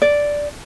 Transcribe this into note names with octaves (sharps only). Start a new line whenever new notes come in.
D5